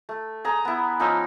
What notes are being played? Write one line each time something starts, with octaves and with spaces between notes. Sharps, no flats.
A3
G#4 A#5
B3 E4
F3 C#4 D#4 E6